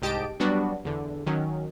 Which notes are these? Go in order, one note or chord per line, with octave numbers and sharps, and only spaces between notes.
C2 G#2 G4 D#5 A5 D7
F#3 G3 B3 D4 F#4
E2 D3
D#3 F#3 C#4